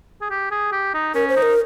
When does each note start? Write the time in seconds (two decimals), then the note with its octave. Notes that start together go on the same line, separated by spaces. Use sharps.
0.21 G#4
0.30 G4
0.51 G#4
0.72 G4
0.94 D#4
1.15 C#4 A#4
1.28 C5
1.36 D#4
1.42 A#4